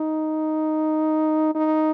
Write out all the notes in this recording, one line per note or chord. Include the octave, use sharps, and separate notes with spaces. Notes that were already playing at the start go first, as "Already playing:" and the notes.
Already playing: D#4
D#4